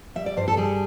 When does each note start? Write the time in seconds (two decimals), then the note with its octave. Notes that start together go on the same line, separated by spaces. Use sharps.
0.16 G3 E5
0.26 D5
0.37 G2 C5
0.48 A4
0.57 G3 G#4